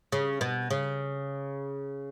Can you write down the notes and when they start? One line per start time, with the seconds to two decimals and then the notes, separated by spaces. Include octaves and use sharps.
0.12 C#3
0.41 B2
0.70 C#3